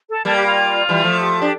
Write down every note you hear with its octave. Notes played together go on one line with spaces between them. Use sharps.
A4
G3 A#3 A4
G4
F4
E3 G3
F3 A3
G4
G4
D4